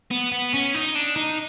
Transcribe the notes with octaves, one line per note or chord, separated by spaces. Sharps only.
B3
B3
C#4
D#4
D4
D#4